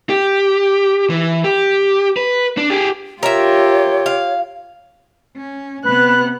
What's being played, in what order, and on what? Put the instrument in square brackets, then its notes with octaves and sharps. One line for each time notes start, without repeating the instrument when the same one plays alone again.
[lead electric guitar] G4
E3
G4
B4
D4
G4 G#4
[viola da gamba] F4 G4 [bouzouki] A#4 E5 [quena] C#5
[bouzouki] F5
[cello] C#4
[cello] C3 B3 [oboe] B4 [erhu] F#6